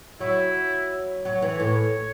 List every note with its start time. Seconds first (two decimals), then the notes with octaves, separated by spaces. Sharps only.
0.20 F#3 E4
1.25 F#3 C#5
1.42 E3
1.60 A2